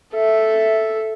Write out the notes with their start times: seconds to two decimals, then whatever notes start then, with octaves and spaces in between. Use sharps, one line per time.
0.14 A4 E5